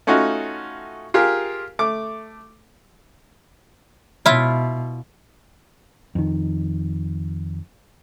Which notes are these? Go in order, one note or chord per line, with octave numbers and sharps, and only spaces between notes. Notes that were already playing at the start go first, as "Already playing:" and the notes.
A3 C#4 D#4 F4 F#4
F4 G4 G#4 A#4
A3 D6
B2 E4 F4
F2 D#3